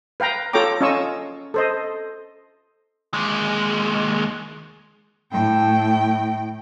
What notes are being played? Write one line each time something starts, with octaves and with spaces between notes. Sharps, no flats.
B4 F5 G5 A#5
F4 A4 C#5 G5 A#5 D6
C#4 F4 D#5 G#5 C#6 E6
A4 C5 D#5
D#2 G#3
A2 G5